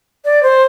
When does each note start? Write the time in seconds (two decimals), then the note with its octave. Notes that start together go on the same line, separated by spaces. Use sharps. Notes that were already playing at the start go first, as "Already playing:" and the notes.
0.25 D5
0.43 C5